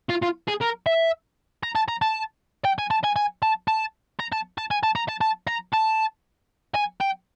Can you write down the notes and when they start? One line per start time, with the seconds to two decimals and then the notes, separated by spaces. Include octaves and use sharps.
0.09 F4
0.22 F4
0.48 G#4
0.61 A#4
0.86 E5
1.63 A#5
1.75 A5
1.88 A#5
2.02 A5
2.65 G5
2.79 G#5
2.91 A5
3.04 G#5
3.16 G#5
3.42 A5
3.68 A5
4.19 A#5
4.32 A5
4.58 A5
4.71 G#5
4.83 A5
4.96 A#5
5.09 A5
5.21 A5
5.47 A#5
5.73 A5
6.75 G#5
7.01 G5